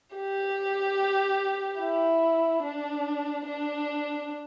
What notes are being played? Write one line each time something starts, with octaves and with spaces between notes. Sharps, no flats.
G4
E4
D4
D4